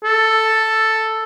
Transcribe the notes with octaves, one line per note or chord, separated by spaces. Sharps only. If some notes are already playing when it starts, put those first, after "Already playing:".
A4